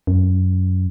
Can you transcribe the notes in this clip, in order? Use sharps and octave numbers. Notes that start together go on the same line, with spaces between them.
F#2